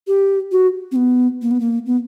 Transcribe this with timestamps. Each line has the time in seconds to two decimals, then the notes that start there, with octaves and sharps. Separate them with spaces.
0.07 G4
0.52 F#4
0.92 C4
0.96 B3
1.42 A#3
1.51 B3
1.60 A#3
1.86 B3